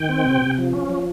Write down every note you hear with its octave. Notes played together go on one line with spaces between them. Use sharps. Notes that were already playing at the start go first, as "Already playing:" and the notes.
Already playing: D#3 G5
C4
C3
C3
F3
C#4
F3